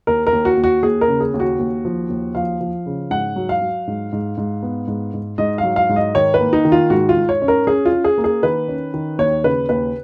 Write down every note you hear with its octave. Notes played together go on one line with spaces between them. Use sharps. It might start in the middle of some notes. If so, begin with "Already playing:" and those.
D#2 A#4
A#4
D#2
F#4
D#2
F#4
D#2 G#4
A#4
C#3
G#4
D#2
F#4
D#2
F3
D#2
F3 F5
F3
C#3
G#2 F#5
F#3
F5
F#3
G#2
G#2
G#2
B3
G#2
G#2
G#2 D#5
F5
F#3
F5
G#2
D#5
D#3 C#5
B4
A#3
D#4
D#3
F4
G#2 F#4
F4
G#2
C#5
C#4
A#4
C#4 G#4
F4
C#4
G#4
A#3
G#4
D#3 B4
C#4
D#3
D#2 C#5
C#3 B4
D#2 B4